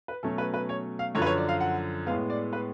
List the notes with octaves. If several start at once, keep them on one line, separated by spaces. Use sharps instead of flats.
B4
B2 F#3 A3 C#4 A4
B4
B4
C#5
F5
F#2 D3 F3 C#5
B4
C#5
D5
F5
F#5
A2 G#3 B3 F5
D5
B4